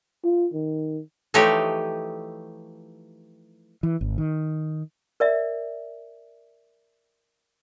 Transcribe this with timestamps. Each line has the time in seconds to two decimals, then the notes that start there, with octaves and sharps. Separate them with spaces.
0.24 F4
0.54 D#3
1.34 E3 F3 A3 D#4 G4 C#5
3.83 E3
4.01 G#1
4.18 D#3
5.20 A#4 D5 E5